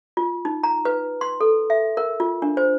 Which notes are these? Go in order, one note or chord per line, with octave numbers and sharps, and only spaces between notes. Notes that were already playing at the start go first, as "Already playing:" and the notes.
F4
D#4
A#5
B4
C6
A4
E5
A#4
F4
D4
C5